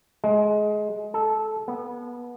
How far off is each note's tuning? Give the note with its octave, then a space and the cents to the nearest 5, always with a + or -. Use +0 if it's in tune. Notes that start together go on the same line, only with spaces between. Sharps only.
G#3 +20
A4 -15
B3 -25